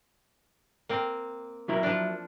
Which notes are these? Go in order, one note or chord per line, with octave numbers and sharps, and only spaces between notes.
A#3 C4
F#3 E4 A#4
F3 D4